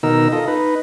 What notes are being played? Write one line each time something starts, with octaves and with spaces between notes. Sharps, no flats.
B2 D#3 D#4 A#4 E6
F4 A4 D#5
D#4 B4